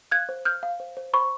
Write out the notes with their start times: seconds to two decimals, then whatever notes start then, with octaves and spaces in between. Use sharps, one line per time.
0.11 F5 F#6 G#6
0.29 C5
0.45 F5 F6 G6
0.63 F5
0.80 C5
0.97 C5
1.13 C5 B5 C#6